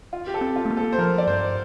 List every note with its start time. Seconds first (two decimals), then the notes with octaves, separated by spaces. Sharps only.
0.13 F4
0.27 G4
0.34 A4
0.41 C4
0.56 F4
0.65 A3
0.71 A#3
0.77 A4
0.93 C5
0.99 F3 A#4
1.18 D5
1.27 G2 C5